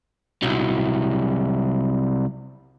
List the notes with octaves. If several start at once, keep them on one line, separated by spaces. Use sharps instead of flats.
C2 F#3